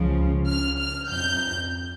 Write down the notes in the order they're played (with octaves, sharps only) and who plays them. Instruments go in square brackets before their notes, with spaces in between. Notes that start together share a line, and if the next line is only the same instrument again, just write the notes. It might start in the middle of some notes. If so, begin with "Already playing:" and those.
Already playing: [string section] C#2 C#3 F3
F6
F6
F2 G6